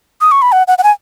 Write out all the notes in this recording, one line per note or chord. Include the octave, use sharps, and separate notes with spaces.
D#6
C#6
B5
F#5
F#5
F#5
G#5